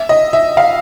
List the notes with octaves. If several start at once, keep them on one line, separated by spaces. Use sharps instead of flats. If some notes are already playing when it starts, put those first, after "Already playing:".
Already playing: E5
D#5
E5
F5